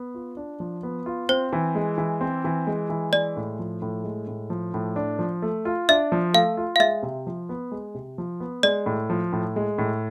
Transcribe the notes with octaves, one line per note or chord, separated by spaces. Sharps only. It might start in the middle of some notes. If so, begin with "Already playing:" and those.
Already playing: B3
F4
D4
F3
B3
F4
C4 C5
E3
G#3
E3
C4
E3
G#3
E3
G#3 D5
A2
F3
A2
G#3
A2
F3
A2
D4
F3
A3
F4
D4 E5
F3
A3 F5
F4
F5
G#3 E5
C3
F3
B3
G#3
C3
F3
B3
G#3 D5
A2
F3
A2
G#3
A2